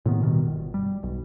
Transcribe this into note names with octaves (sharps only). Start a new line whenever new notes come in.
A2 C3 D#3 B3
B2 D#3 F3 G3
G1
G3
B1